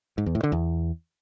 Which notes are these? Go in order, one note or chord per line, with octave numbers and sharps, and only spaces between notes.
G#2
E2
A2
D3
E2